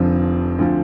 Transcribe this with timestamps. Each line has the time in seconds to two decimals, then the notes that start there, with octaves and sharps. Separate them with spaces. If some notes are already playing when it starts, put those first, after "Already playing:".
Already playing: F1 F2 D3 F3 C4
0.59 D2 D3 F3